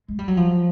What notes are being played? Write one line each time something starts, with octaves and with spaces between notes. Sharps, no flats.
G#3
G3
F#3
F3